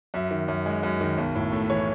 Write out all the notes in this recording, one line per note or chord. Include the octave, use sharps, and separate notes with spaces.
F#2 E5
D#3
F#2
G#3
F#2
D#3
B1
A2
A3
E3 C#5